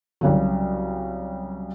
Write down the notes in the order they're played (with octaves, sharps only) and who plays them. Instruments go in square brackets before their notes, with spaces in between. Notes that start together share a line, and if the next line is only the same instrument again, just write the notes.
[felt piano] C2 C#3 F#3